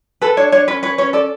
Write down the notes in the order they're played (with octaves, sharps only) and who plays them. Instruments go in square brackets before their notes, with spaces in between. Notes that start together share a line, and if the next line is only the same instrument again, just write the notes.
[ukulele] A4 B4
D4 C#5
D4 C#5
C#4 B4
B4 C#5
C#4 C#5
A4 D5